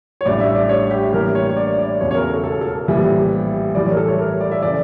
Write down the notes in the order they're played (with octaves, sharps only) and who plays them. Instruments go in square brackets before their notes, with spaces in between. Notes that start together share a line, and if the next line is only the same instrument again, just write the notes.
[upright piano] C#5
[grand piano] A1 A2 G3 D4 [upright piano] D5
[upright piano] E5
D5
C#5
G4
[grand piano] A2 E3 G3 A#3 D4 [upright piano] A#4
[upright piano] C#5
C#5
D5
D5
[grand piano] E1 E2 C#3 [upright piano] C#5
[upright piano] C#5
A#4
A4
A4
A4
A#4
[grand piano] A#1 A2 E3 G3 [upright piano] G4
[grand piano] A2 E3 G3 [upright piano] D5
[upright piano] C#5
A#4
A4
C#5
A#4
C#5
D5
E5
[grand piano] C#3 E3 A3 [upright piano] D5